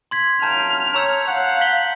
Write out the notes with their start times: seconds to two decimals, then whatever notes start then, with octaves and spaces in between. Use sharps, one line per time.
0.11 C6 G#6 B6
0.42 F#2 F5 G5 A5 A#5 F6 G6
0.94 C#5 A#5 E6 G6
1.28 F5 F#5 G6
1.61 B6 F#7 G7